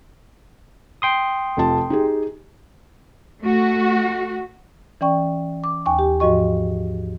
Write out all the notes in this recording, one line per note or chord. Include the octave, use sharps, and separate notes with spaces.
G5 C6 D#6
F1 F4 A5
D#4 G4 G#4
A3 F#4
E3 C#4 D5 G5 C#6
D6
D#2 G5 G#5 C#6
G4
G#2 F3 F#4 D#5 C#6